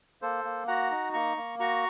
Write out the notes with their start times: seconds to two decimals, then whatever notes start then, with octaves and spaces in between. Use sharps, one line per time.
0.22 A#3 A4 C5
0.45 A#3
0.67 F#4 F#5 A#5
0.91 D#4
1.13 A#3 A#5 C#6
1.37 A#3
1.60 F#4 A#5 C#6